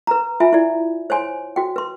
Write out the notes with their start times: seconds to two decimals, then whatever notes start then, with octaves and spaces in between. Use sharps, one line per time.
0.07 B4 A#5
0.40 F4 E5 G#5 B5
0.53 E4 D5
1.10 C5 C#5 G#5 C6
1.56 F#4 G5
1.76 B4 C6